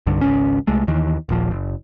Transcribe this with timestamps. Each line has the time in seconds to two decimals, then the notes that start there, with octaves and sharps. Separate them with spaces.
0.07 C2 G2 D3
0.21 G#1 C#2 C#4
0.67 C2 G#3 A3
0.87 D#2 D#3 E3
1.29 D#1 A#1 F3
1.51 F#1